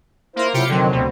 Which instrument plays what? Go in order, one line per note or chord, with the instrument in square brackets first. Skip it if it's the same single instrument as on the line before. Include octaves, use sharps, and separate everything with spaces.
[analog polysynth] A#3 A#4 [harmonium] E4 F4 C5
[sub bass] C3 [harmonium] F#3 E4 [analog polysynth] F4 G4 C#7
[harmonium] F2 D#3 C4 [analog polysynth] D3 F#3
[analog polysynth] D2 B2 [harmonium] C4